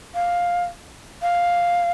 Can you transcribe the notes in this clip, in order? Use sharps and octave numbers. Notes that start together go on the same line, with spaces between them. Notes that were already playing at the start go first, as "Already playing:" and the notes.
F5
F5